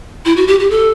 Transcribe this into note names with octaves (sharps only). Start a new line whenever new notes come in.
E4
F#4
G4
G4
A4